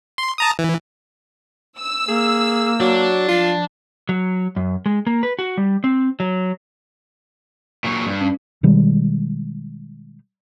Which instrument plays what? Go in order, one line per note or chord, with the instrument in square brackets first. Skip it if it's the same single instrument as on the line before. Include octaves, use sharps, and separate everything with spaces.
[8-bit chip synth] C6
A5 A#5 D#6
E3
[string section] E6
[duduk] A#3 [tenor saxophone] G#4
[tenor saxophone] F#3 [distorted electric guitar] D4
[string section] F3 [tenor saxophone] F4
[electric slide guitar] F#3
F#2
G#3
A#3
B4
F#4
G3
C4
F#3
[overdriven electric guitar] A#2 F#3
G2
[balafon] C#4
[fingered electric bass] B2 D#3 G3 G#3